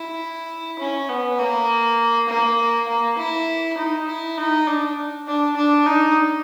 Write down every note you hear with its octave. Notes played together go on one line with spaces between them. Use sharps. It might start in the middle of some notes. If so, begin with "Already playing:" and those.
Already playing: E4
C#4
B3
A#3
A#3
A#3
E4
D#4
E4
D#4
D4
D4
D4
D#4